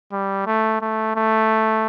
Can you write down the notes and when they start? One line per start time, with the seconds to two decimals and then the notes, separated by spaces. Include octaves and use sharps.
0.12 G3
0.46 A3
0.81 A3
1.16 A3